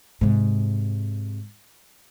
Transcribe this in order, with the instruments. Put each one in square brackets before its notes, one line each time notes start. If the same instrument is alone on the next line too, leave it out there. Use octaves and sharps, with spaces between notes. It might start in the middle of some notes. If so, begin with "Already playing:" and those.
[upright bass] G#2 C3